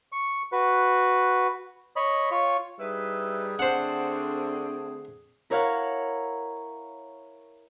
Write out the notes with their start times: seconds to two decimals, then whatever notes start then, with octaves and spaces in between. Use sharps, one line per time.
0.12 C#6
0.52 F#4 B4
1.96 C#5 D#5 B5
2.31 F4 C#5
2.79 G3 D#4 E4 G#4 B4
3.59 D3 A3 C4 D4 C5 F#5
5.50 E4 A#4 C#5 F5 F#5